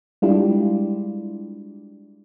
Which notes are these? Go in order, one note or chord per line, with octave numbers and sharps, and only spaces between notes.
G3 G#3 D4 E4 F4 G4